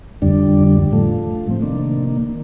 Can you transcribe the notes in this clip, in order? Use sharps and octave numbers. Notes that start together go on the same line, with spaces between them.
F2 D3 G3 D4
A2 F3 A3
C4
C3 D#3 A#3 D4